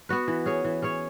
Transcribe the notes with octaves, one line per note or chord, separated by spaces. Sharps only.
B3 F#4 B4
E3
C#4 G#4 C#5
E3
C#4 G#4 C#5